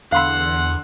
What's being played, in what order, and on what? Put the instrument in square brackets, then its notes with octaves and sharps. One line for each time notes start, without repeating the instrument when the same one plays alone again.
[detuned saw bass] E2 [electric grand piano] D3 C6 E6 [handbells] F5 B5 [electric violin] F#5